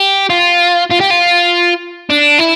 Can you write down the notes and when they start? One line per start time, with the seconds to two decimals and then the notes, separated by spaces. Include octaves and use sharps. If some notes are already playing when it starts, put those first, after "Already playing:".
Already playing: G4
0.30 F4
0.90 F4
1.00 G4
1.10 F4
2.10 D4
2.39 E4